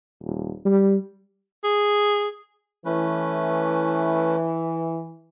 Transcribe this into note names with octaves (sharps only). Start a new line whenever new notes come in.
D#1
G3
G#4
E3 A3 C#4 B4